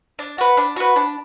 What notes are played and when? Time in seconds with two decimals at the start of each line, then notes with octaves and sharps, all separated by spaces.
0.19 D4
0.38 F#4 B4
0.57 D4
0.76 F#4 B4
0.96 D4